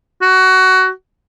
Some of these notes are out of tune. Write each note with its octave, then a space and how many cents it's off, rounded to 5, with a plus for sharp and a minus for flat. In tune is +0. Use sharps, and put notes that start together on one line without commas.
F#4 +20